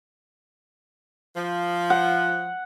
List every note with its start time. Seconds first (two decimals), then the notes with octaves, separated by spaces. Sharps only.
1.37 F3
1.90 F#5